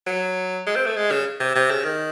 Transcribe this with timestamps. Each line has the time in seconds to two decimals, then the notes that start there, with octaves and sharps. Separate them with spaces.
0.07 F#3
0.67 G#3
0.76 C4
0.86 A3
0.96 G#3
1.11 C#3
1.40 C3
1.55 C3
1.71 C#3
1.84 D#3